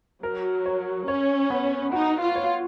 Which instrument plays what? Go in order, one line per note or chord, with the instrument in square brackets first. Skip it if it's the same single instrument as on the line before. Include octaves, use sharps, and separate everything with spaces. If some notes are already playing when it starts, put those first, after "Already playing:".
[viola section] F#3 [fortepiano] A#4
[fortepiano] C#5
[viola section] C#4 [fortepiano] C#5
[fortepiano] B3
[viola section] D#4 [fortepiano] F#4
[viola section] F4
[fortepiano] C#5